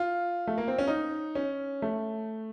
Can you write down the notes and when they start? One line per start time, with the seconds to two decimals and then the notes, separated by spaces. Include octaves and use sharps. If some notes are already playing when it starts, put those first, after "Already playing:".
Already playing: F4
0.47 A3
0.58 A#3
0.68 C4
0.79 C#4
0.87 D#4
1.35 C#4
1.82 A3